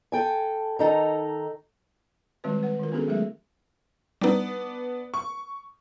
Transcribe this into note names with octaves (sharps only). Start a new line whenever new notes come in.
A4 G5 G#5
D#3 D#4 A4 A#5
D#3 G3 G#3 C4 F#4 B4
B4 F#5
D#3 F4 A#4
B3 C#4 D4 F#4 G#4 A4
F#3 G#3 A3 G#4 A#4 E5
G3 B3 D4 D#4
C#6